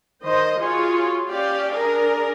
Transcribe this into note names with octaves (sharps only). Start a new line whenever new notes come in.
D#3 C5 D#5
F4 F#4 G#4 C#5
C#4 G4 D5 F5
D4 G#4 A#4